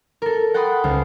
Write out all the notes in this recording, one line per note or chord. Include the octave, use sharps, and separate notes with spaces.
A4 A#4
F#5 G5 A5 B5 C6 D#6
C#2 C5 F6